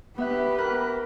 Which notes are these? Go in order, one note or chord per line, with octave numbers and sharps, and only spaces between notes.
B3 G4 B4 E5 F#6
A#4 F#6